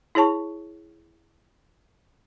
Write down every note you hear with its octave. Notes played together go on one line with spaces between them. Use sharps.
E4 G#4 C#5 A5 C#6